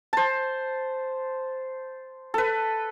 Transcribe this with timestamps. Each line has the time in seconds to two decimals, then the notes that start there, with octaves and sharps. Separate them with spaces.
0.13 C5 A5
2.34 A4 B4